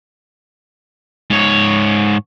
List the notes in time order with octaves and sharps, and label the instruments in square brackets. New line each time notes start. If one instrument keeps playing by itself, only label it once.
[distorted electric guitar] G#2 C#5